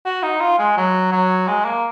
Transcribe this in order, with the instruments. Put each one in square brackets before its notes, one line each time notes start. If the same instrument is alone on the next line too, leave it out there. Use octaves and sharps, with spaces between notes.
[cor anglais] F#4
D#4
F4
G#3
F#3
F#3
G#3
A#3